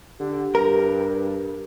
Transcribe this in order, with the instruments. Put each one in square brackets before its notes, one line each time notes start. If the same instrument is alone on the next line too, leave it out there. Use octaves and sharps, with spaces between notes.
[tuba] D3 [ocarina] G4
[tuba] G2 [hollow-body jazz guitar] A#4